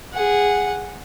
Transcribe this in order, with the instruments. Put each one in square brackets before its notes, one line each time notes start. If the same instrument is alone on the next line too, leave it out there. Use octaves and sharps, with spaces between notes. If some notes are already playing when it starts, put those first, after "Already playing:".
[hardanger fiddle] G#4 F#5